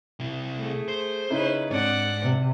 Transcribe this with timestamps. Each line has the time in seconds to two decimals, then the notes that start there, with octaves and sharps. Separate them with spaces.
0.20 C3 E4
0.57 A3 G#4
0.88 C5
1.30 C#3 C#4 D#4 E4 B4
1.71 G#2 C4 D4 D5 F#5
2.22 C3